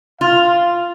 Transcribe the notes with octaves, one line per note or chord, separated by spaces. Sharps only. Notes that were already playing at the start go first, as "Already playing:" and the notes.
F4 F5